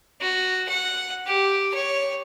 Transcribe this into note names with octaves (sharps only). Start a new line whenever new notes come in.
F#4
F#5
G4
C#5